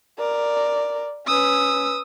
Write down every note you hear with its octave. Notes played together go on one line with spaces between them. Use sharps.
A#4 D5
C#4 B4 D#6 E6